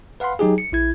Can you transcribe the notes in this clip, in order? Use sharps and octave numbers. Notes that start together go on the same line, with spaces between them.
B4 F5 F#5 B5 C6
F#3 D#4 G4 G#4
C#7
A#1 E4 G#6